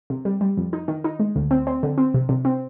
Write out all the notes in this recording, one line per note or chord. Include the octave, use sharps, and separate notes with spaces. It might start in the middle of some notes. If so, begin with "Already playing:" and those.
C3
G3
G3
F2
D#4
D#3
D#4
G#3
D2
C4
C4
D3
C4
C3
C3
C4